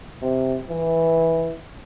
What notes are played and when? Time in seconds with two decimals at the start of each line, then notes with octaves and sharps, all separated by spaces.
0.22 C3
0.69 E3